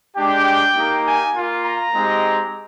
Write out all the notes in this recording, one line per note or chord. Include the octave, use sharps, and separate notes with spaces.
G#3 D4 G4 G5
A#3 D#4 G4
G#5
A#3 F4
A#5
G#3 C4 D#4 G4